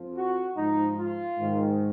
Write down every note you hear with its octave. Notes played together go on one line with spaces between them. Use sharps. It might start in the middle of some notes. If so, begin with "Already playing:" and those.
Already playing: F2 F3
F#4
G#2 F3 D#4
F4
G#2 D#3